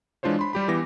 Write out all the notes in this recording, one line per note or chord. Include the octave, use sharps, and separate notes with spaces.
E3 G#3 D4 F4 C5 C#5
B5 C6
G3 G4 B5
E3 B3 G4 A#6